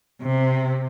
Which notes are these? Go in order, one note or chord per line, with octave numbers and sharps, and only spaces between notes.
C3